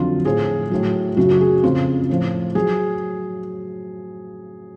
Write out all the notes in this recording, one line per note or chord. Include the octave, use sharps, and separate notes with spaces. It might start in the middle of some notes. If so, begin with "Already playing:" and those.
Already playing: F2 D3 F#3 F4
A2 F3 G#4
A2 F#3
F#2 C#3 F#3 F#4
F#4
G#4
F2 C#3 F3 F4
A2 F3
F#3 G#4